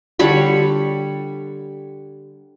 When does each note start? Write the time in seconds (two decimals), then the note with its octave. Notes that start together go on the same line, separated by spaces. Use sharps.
0.19 D3 G3 C#5 B5